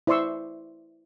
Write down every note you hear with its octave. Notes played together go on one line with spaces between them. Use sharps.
E4 C5 D5 C6 C#6 E6